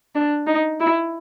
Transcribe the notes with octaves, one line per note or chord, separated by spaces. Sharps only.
D4
D#4
E4